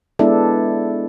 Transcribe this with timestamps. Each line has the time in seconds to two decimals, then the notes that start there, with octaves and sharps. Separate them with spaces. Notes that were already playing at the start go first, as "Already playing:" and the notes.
0.19 G#3 B3 D4 E4 A4